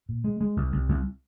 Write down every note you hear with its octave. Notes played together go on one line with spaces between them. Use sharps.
A#2
G#3
G#3
C2
C2
C2